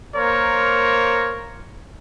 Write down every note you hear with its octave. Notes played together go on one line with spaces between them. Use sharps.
A#3 A#4 C5 C#5